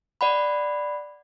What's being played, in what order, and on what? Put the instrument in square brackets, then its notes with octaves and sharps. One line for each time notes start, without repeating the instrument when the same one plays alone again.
[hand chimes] D5 F#5 B5